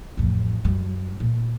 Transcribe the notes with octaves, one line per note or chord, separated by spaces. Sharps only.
A1 F2
F#2 G3
A#2